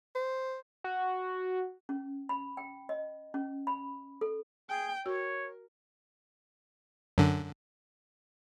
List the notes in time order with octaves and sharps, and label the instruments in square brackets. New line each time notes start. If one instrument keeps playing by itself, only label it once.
[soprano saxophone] C5
[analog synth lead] F#4
[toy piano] C#4
B5
G5
D#5
C#4
B5
A4
[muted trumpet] G#4 [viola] G5
[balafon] F#4 [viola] A#4 [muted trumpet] C#5
[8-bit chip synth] F#2 D3